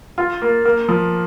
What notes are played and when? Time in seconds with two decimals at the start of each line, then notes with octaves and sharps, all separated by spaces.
0.18 F4
0.42 A#3
0.65 A#3
0.89 F3